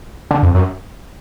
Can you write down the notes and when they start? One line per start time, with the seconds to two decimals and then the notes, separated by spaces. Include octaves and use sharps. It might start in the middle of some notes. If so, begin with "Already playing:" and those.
0.31 D3
0.43 F2
0.55 F#2